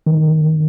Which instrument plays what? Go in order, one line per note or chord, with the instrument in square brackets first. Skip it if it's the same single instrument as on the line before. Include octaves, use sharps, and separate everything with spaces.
[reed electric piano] D#3